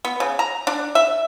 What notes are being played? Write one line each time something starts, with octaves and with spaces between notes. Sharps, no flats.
B3
C#3
A#5
D4
E5